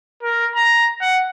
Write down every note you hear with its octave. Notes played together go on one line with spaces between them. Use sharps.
A#4
A#5
F#5